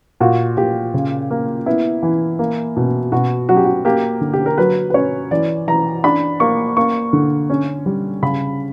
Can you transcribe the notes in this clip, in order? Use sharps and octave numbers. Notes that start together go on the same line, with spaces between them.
A#2 F#4
A#2 G4
C#3
A#3
B3 E4
E3
A#3
B2
B2 F#4
F#3 F#4
G4
F#4
A#3 G4
D3
G4
A#4
F#3 B4
B4
C#4 C#5
E3 D5
E3 A#5
D4 B5
A#3 C#6
A#3 C#6
D3
C#4
G3
C#3 B5